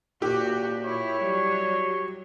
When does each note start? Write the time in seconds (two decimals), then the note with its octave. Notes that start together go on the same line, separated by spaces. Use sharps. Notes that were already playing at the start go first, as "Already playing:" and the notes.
0.22 A#2 F#4 G4
0.85 E4 C#5
1.22 F#3 G3